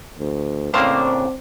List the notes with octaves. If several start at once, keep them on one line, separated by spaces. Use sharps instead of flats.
D2
A2 C#3 A#3 C4 D4 C5 F5 D6